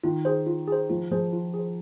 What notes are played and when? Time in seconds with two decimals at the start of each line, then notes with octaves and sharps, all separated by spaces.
0.04 D#3 F4
0.25 G#4 C5
0.47 F4
0.68 G#4 C5
0.90 F3 F4
1.11 F3 G#4 C5
1.33 F4
1.54 G#4
1.59 C5